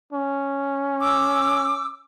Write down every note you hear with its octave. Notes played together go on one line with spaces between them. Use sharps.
C#4
D6 E6